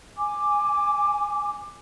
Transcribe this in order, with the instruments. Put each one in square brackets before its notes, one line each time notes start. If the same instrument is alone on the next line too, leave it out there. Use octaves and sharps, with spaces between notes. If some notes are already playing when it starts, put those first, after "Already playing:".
[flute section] G#5 D6